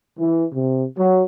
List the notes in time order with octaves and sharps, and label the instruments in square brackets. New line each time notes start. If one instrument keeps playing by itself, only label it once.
[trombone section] E3
C3
F#3